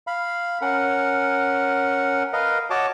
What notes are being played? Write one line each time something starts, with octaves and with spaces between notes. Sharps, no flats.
F5 B5
C#4 A#4 F#5
A#4 B4 D#5 F5
F#4 C#5 D#5 A5 D6